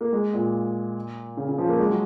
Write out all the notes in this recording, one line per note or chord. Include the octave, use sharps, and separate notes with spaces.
A#3
G#3
A#2
C#3
C#3
F3
A#3
G#3
F#3